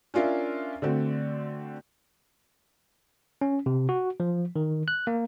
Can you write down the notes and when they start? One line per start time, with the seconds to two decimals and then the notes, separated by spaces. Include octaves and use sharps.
0.14 C#4 D4 F4 A#4 E5
0.82 D3 A3 C4 F#4
3.41 C#4
3.66 C3
3.89 F#4
4.20 F3
4.56 D#3
4.88 F#6
5.07 A#3